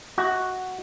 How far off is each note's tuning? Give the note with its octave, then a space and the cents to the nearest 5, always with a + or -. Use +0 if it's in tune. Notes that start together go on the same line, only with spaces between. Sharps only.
F#4 +0 D#5 +45